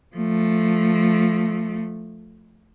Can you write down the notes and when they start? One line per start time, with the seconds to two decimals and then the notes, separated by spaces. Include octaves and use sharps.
0.16 F3 A3